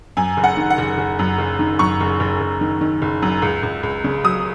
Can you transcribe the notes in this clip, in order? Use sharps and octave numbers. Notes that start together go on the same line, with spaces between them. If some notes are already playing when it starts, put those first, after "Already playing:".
F#2 G#5
F#1
F#5
D#3
F#5
F#1
F#1
F#2
F#1
D#3
F#2 C#6
F#1
F#1
F#1
D#3
D#3
F#1
F#2
C#2
C#2
C#2
C#3
F#3 D#6